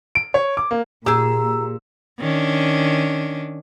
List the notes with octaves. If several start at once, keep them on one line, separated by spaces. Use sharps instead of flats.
D7
C#5
D6
A#3
A#2 G4 G#4 A#5 E6
D#3 C#4 D4